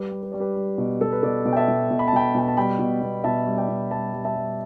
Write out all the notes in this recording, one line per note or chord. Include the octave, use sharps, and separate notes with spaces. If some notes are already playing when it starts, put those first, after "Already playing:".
Already playing: G3 G4 B4
G3
B4
G3 D5
G4 B4
G3
B2
B2 A4
B4
B2 A4 D5
B2
G5
E5 A5
B2
B2
B5
A5
B2 G5 B5
B2 G5
A5
G3 G5 B5
B2
B2
B2 E5 A5
G3
D5 G5
B2
G3 E5 A5
G3
E5 A5
G3